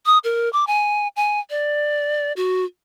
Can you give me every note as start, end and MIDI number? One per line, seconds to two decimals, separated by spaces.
0.06 0.18 87
0.24 0.51 70
0.53 0.67 86
0.67 1.08 80
1.16 1.40 80
1.50 2.33 74
2.36 2.65 66